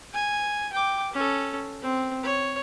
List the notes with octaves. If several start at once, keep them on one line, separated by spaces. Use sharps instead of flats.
G#5
G5 D6
C#4 A4
C4
C#5